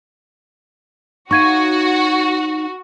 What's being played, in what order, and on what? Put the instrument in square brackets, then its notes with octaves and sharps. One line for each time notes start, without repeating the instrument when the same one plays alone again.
[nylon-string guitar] D#4 C#5 F5 [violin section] F#4 [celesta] C#6 G#6 D#7